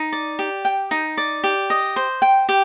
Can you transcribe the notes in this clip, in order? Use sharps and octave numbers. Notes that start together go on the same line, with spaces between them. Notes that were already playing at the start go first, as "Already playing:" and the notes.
Already playing: D#4
D5
G4
G5
D#4
D5
G4
D#5
C5
G5
G4